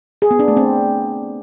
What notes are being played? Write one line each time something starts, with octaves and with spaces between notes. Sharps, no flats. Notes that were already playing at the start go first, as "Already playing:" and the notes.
G#4
B3
D4
A3
C4